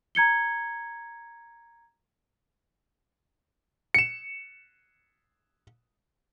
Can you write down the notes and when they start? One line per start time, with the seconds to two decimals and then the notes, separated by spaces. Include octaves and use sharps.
0.15 A#5 G#6 C#7 G7
3.94 C#7 E7